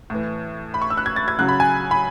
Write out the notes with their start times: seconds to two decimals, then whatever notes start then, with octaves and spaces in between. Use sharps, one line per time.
0.10 A2 E3
0.74 B5
0.82 C#6
0.90 E6
0.97 F#6
1.06 G#6
1.16 A6
1.28 G#6
1.38 C#3 F#3 F#6
1.48 B5
1.60 G#5
1.91 B5